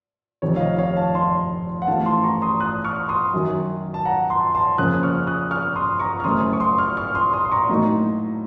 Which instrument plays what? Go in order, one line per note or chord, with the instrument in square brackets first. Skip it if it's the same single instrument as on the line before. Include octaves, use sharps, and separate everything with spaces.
[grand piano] F1 F2 C3 D#3 C#5
F5
D#5
C#5 F5
F5 A5
A5 C6
F#5
A1 A2 F3 A3 F5 A5
A5 C6
A#5 C#6
C6 D#6
D#6 F#6
C#6 F6
C6 D#6
F#2 D#3 F#3
A5
F#5 A#5
A5 C6
A5 C6
F2 C#3 F3 A#3 C#4 D#6 F#6
C#6 F6
D#6 F#6
C#6 F6
C6 D#6
A#5 C#6
F6
F#1 F#2 C#3 A3 C#4 C6 D#6
C#6
C6 D#6
C#6 F6
C#6 F6
C6 D#6
C6 D#6
C6
A#5 C#6
A2 F#3 A#3 D#4